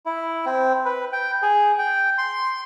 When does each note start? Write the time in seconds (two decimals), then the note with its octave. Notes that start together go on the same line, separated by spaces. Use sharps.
0.06 E4
0.46 C4
0.85 B4
1.12 G5
1.43 G#4
1.78 G5
2.18 C6